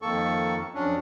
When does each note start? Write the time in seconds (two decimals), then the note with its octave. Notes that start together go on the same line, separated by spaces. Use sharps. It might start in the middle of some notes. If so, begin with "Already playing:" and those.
0.02 F2 D#3 A#3 A4 C#6
0.75 F2 F#3 C#4 D4